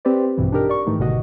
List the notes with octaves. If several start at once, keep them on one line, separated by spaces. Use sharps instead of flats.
C4 G4 B4 C5 D5
A#1 G2 B2 E3
D4 D#4 G4 A#4
D5 C#6
G#2 D#3 E3 A3 D#4
G1 B2 D3 D#3 F#4 D#5